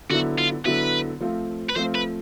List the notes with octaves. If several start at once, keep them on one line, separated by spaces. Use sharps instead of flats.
D3 F#3 B3 E4 F#4
F4
D3 F#3 B3 E4 B4
F3 A3 C4 F4
B4
F3 A3 C4 F4 C5
B4